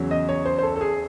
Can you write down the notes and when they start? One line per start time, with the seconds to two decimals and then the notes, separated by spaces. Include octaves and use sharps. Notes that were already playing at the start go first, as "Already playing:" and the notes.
Already playing: E2 C#3 F#3
0.11 D#5
0.29 C#5
0.45 C5
0.58 C5
0.63 A4
0.76 A4
0.81 G#4